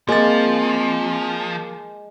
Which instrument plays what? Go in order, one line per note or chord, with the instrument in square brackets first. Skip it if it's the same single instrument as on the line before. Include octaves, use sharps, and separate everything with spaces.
[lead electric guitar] F3 [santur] G#3 [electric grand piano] A#3 A6 [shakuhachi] C4